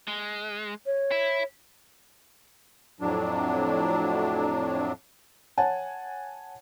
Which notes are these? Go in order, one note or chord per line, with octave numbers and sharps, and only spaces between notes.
G#3
C#5
E4
F2 A2 F#3 D4
C#5 F#5 G#5 A5